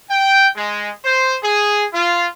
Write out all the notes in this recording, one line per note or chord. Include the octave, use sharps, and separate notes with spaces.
G5
G#3
C5
G#4
F4